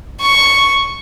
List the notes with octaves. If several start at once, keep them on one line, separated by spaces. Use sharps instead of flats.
C#6